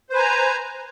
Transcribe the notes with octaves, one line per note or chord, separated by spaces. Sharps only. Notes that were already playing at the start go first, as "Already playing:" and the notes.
B4 C5 G#5 A#5